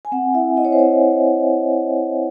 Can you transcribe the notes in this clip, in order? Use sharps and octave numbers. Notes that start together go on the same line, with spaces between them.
G#5
C4 F#5
E4 E5
E4 D#5
C#5
C5
C4 C#5